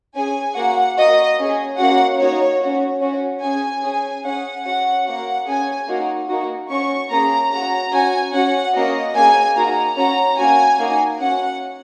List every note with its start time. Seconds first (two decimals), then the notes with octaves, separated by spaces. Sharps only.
0.15 C#4 G#4 G#5
0.56 A#3 F#4 F#5
0.96 A#3 F#4 D#5
1.38 C#4 G#4
1.78 A#3 C#4 F#4 F#5
2.19 A#3 D#4 F#4 C#5
2.60 C#4 F#4
3.01 C#4 F#4
3.42 C#4 G#4 G#5
3.83 C#4 G#4 G#5
4.24 C#4 G#4 F#5
4.65 C#4 F#4 F#5
5.06 A#3 F#4 F#5
5.47 C#4 G#4 G#5
5.88 A#3 D#4 F#4
6.28 A#3 D#4 F#4
6.69 C#4 F#4 C#6
7.10 A#3 C#4 G#4 A#5
7.51 C#4 F#4 A#5
7.92 C#4 F#4 G#5
8.33 C#4 F#4 F#5
8.74 A#3 C#4 F#4 D#5
9.15 A#3 C#4 G#4 G#5
9.56 A#3 D#4 F#4 A#5
9.96 C#4 F#4 A#5
10.38 A#3 C#4 F#4 G#5
10.79 A#3 D#4 F#4
11.19 C#4 F#4 F#5